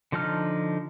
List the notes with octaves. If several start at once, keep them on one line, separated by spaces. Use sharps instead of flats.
D3 F3 D#4 A5 F6